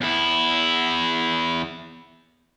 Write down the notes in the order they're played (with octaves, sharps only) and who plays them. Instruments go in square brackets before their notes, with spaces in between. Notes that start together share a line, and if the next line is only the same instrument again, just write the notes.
[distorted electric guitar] E2 E4